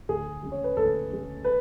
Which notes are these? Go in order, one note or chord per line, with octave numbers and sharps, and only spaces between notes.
D2 G#4
C#3 G#3
C#5
B4
D2 A4
C#3 G#3
B4